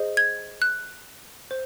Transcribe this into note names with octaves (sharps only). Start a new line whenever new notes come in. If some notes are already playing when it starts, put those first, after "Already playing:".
Already playing: G#4 C5 D#5
G#6
F#6
C5